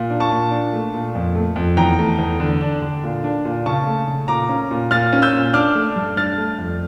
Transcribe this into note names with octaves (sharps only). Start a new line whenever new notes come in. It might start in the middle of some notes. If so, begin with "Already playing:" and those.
Already playing: A#2
D4
A5 C#6
A#2
D4
A3
A#2
F2
A3
F2
E2 G5 A#5
A3
E2
D3
D4
D3
A#2
D4
A#2
C#3 A5 C#6
A3
C#3
A#2 A#5 D6
C#4
A#2
A#2 F6 A6
C#4
E6 G6
A#2
D4 D6 F6
A3
G2
D4 F6 A6
A3
F2